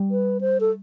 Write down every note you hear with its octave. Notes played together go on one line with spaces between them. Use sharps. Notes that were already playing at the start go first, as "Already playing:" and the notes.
Already playing: G3
B4
C5
A4